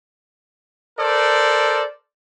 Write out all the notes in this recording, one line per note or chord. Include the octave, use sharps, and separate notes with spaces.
A4 A#4 C5 D5